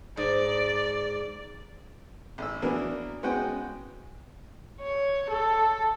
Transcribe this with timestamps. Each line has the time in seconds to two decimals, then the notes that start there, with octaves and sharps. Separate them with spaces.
0.17 G#2 D5
2.38 A1 E6
2.62 E3 F#3 A#3 B3 D4 A#4
3.23 G#3 B3 C#4 F#4 F#5 G5
4.81 C#5
5.30 A4